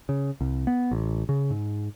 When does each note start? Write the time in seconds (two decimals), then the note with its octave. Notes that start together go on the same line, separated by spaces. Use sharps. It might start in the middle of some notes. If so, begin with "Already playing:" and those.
0.09 C#3
0.41 C2
0.67 B3
0.91 A1
1.29 C#3
1.50 G#2